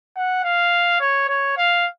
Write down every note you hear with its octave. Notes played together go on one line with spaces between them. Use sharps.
F#5
F5
C#5
C#5
F5